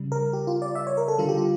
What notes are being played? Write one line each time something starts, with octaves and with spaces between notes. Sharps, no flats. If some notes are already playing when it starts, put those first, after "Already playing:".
Already playing: C#3 G3
A#4
G4
F4
D5
E5
C#5
A#4
A4
D3 G3 F4
G4
F4